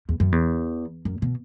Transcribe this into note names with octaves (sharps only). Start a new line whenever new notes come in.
E2
F#2
E2
F#2
B2